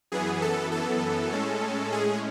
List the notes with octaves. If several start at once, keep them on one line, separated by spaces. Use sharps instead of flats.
F#2 E3 B3 G#4
A4
A4
A2 G#3 C#4
G#4